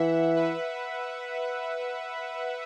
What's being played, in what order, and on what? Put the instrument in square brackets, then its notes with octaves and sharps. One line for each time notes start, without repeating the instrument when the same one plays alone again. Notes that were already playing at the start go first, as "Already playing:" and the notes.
Already playing: [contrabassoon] E3 [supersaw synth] E5 F#5
[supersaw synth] B4